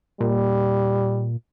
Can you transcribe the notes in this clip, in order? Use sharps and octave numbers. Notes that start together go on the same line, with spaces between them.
A#2 G3